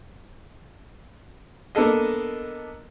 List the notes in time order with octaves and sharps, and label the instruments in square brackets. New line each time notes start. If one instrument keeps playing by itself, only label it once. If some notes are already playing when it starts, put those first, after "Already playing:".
[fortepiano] A#3 B3 D4 A4 D#5